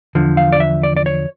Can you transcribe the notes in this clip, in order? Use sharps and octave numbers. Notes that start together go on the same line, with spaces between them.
E2 D3 F3
F5
D5
E5
D5
D5
C#5